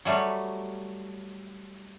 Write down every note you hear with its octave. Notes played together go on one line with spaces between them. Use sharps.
F#3 G3 A3